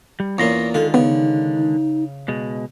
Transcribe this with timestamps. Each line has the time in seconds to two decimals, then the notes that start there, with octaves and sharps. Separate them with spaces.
0.20 G3
0.38 E2 A#2 C#4 C#5 A#5 C6
0.74 D3 D#3 G#3 F4 A4
0.94 C#3 B3 D#4
2.28 B2 G#3